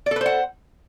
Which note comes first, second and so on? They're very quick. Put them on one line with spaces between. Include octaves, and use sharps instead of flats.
D5 A4 B4 C5 F#5